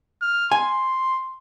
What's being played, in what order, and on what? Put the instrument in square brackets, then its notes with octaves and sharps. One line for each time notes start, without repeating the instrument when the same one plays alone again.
[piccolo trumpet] F6
[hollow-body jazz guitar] G#5 [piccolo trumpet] C6